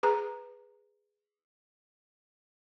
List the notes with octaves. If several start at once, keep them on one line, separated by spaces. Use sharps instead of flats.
G#4 B4 A#5